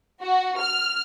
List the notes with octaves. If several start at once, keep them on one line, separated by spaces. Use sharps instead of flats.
F#4
F6